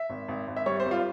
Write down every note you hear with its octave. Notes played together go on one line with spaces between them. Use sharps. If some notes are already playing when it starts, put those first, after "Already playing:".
Already playing: E5
G#1
G#1
G#1
E5
G3 C#5
C5
G#1
F4